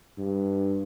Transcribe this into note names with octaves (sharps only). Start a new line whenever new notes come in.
G2